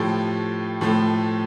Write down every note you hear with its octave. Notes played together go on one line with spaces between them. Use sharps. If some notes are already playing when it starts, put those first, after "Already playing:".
Already playing: A2 F3 A3 G4
A2 F3 A3